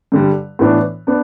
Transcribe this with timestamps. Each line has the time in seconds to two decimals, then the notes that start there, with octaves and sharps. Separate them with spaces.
0.12 G2 D3 G3
0.59 A2 E3 B3 D4
1.07 B3 D4